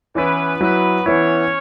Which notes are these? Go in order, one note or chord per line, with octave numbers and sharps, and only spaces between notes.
E3 B3 C#4 E4 B4
F#3 B3 E4 B4
E3 B3 C#4 E4 C#5